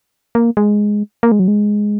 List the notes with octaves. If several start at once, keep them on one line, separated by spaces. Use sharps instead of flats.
A#3
G#3
A#3
G#3
F#3
G#3